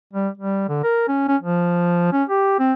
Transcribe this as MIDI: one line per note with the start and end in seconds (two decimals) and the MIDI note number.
0.13 0.28 55
0.37 0.65 55
0.69 0.83 50
0.83 1.06 70
1.08 1.26 61
1.28 1.36 61
1.41 2.12 53
2.13 2.24 61
2.29 2.58 67
2.59 2.73 60